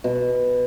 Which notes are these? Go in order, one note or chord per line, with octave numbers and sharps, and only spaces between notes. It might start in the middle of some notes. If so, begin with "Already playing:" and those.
B2